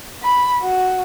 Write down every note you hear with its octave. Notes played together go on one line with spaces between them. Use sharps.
B5
F#4